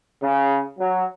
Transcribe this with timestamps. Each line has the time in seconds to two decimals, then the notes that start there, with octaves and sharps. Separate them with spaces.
0.23 C#3
0.78 F#3